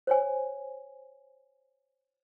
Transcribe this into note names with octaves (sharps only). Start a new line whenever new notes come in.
C5 C#5 G#5